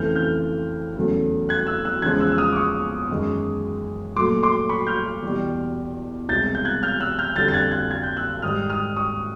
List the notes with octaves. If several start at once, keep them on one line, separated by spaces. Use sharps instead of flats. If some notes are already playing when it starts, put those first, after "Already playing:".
Already playing: F2 C#3 E3 A3 F6 G6
F6 G6
E2 C#3 F#3 A3
F#6 G#6
E6 F#6
E6 F#6
E2 C#3 F3 G#3 F#6 G#6
E6 F#6
E6
D#6 F6
D6
C#6 D#6
F#2 D#3 G#3
A#2 F#3 A3 C6 D6
C6 D6
B5 C#6
F6 G6
E2 B2 G3
C2 B2 G#3 G6 A6
G6
F#6 G#6
F6 G6
E6 F#6
F6 G6
F2 D3 G3 G6 A6
A6
F#6 G#6
F#6 G#6
G#6
G6
E6 F#6
G#2 D#3 G3 D#6 F6
D#6 F6
C#6 D#6